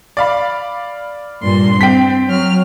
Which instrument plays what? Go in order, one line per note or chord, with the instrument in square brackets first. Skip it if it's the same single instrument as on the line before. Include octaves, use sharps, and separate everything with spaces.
[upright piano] D5 F5 B5
[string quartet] G2 A#2 C6
[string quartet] C4 [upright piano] G5 B6
[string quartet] F#3 F6